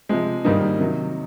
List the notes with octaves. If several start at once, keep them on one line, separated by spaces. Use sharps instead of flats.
C3 F3 G#3
G#2 D#3 G3 A#3 D#4
C3 D#3 F#3